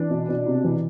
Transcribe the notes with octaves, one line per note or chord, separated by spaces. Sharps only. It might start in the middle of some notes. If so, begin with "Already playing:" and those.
Already playing: E3 D4
B2
B2
C3
E3